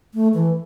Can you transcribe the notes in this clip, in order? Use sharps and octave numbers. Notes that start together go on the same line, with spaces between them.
A3
E3